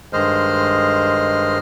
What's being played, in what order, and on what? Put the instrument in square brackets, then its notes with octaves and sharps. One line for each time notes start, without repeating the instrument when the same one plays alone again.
[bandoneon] G2 D#3 G#3 C5 D#5 F6